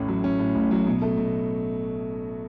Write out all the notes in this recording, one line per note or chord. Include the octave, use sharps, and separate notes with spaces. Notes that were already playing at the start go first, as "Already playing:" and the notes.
Already playing: A1 A2 C#4
F#3
C#4
A2
A1
F#3
B2
A3
B2